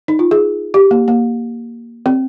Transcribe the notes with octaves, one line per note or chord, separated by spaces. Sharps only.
D#4
F4
G#4
G4
A#3
A#3
C4